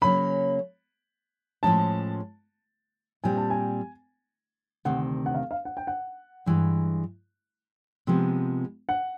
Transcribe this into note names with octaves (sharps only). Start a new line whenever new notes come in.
C#3 F#3 A#3 C#4 B5
A2 F3 G#3 C#4 A5
A#2 G3 C4 G#5
A5
G#5
D2 C3 D#3 F#5
F#5
F5
F5
F#5
G5
F#5
G2 E3 G#3
C3 F3 G#3 B3
F#5